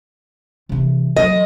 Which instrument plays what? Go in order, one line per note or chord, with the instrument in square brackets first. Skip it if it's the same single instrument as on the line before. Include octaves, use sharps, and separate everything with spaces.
[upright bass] C3 E3
[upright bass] E3 F#3 [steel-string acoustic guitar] D#5